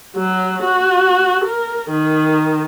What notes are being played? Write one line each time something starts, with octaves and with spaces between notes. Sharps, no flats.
F#3
F#4
A#4
D#3